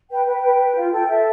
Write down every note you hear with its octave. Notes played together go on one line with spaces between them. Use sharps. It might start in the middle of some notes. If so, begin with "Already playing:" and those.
B4 G5
B4 G5
B4
B4
F4
A4 G5
A4 E5